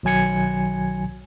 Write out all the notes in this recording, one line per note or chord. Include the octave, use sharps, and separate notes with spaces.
B1 D#3 F#3 G#5 G#6 C#7